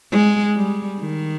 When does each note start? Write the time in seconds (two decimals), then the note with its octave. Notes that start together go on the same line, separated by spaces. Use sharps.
0.11 G#3
0.56 G3
1.00 D#3